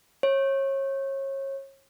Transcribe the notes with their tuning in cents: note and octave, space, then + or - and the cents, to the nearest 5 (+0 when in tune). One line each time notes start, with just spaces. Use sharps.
C#5 -30